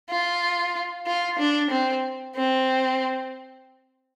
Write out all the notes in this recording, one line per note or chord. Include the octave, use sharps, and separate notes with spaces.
F4
F4
D4
C4
C4